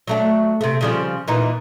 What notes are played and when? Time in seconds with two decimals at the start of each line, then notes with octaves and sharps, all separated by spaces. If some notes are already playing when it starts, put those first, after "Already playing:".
0.07 F#3 A3 D4
0.61 C3 A3
0.81 C#3 F3 G3
1.28 A#2 E3 D#4